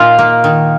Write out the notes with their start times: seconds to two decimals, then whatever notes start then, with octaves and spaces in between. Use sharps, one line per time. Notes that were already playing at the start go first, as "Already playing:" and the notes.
Already playing: A#2 D#4 F4
0.19 A#3
0.44 D#3